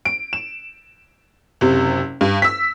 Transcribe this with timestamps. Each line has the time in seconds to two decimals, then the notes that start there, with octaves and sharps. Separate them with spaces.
0.05 D7
0.33 E7
1.61 F#1 C3
2.21 G2
2.42 E6 B6